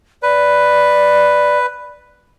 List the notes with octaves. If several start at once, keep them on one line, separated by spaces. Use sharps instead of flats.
B4 D5